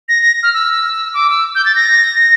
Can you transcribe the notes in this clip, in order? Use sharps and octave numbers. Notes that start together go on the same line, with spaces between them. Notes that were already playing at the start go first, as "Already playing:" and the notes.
A#6
A#6
F6
E6
D6
E6
G6
A6
A#6